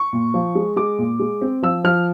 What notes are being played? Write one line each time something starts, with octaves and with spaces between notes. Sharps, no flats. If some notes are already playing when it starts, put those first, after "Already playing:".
Already playing: C#6
A#2
F3
G#3
G#3 D6
A#2
G#3
C4
F3 E6
F3 F6